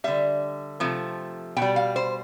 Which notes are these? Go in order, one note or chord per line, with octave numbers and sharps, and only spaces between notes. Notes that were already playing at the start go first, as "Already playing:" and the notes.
D3 G3 E5
C3 F3 A3
B2 G5
G3
F5
C5